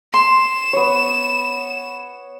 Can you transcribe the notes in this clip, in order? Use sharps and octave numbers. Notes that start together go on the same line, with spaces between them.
C6 E7
B3 C#5